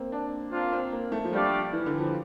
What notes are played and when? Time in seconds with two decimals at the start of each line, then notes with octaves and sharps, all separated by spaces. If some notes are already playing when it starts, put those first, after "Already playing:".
Already playing: A#3 C4
0.12 D4
0.52 A#3 C4 D4 F4
0.73 C4
0.92 A#3
1.12 A3
1.25 F3
1.33 G3 A3 D4 G4 D5 F5
1.73 E3
1.86 D3
1.99 F3